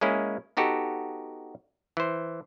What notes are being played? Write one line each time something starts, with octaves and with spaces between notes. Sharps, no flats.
G#3 A#3 C#4 E4 G#4
B3 D#4 F#4 G4 A4
E3 C5